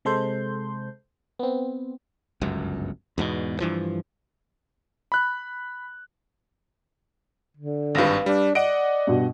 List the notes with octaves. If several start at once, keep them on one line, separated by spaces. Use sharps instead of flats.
C3 G#3 A4 C5 C6 G6
B3 C4
G1 C#2 F#2
E2 G#2 B2
G2 E3 F3
B5 F#6
D3
G#1 G2 B4 F5 A#6
G3 D4
D5 D#5 F#5 D7
G2 B2